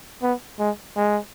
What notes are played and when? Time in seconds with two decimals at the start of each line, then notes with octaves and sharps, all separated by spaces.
0.23 B3
0.59 G#3
0.96 G#3